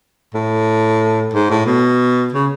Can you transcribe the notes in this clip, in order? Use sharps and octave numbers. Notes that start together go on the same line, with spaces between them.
A2
G#2
A2
B2
C#3